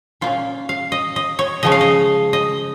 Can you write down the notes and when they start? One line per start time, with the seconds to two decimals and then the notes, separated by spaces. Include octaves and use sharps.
0.21 A#2 A#3 C#4 F4
0.69 F5
0.92 D#5
1.16 D#5
1.39 C#5
1.63 C#3 F3 G#3 C#4 D#5
1.72 F5
1.81 D#5
2.33 D#5